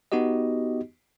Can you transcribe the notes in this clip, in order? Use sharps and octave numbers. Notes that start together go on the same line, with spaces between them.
B3 D#4 F#4 G4 D#5